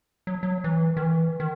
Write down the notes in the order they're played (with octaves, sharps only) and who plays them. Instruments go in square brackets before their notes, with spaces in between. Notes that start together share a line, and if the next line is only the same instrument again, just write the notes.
[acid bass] F#3
F#3
E3
D#3
E3
D#3